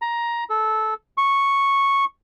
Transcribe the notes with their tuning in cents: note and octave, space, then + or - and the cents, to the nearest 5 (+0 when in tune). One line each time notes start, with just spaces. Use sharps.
A#5 +15
A4 -15
C#6 -5